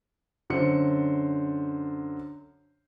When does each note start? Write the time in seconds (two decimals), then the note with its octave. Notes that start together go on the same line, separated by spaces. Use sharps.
0.50 F#2 D3 C5 C#7